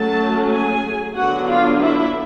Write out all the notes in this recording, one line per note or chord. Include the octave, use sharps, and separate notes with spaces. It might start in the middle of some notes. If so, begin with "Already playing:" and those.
Already playing: F#3 A3 C#4 A4 A5
G#4 G#5
D3 F#3 B3 D4 F#4 F#5
F4 F5
E4 E5